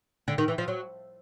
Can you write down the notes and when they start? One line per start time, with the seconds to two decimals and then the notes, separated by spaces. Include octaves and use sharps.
0.28 D3
0.38 D#3
0.48 E3
0.58 F3
0.68 F#3